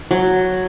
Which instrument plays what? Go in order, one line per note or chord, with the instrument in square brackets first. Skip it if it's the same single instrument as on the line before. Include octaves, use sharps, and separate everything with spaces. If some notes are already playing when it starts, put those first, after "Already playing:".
[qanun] F#3